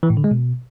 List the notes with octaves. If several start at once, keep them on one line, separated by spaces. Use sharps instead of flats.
E3
A2
D3
G#3
B2